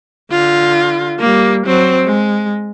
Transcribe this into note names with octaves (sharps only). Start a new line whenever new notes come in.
D3 F4
G3 A#3
F#3 C4
G#3